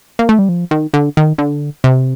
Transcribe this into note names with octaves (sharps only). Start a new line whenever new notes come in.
A#3
A3
G3
F3
D#3
D3
D#3
D3
C3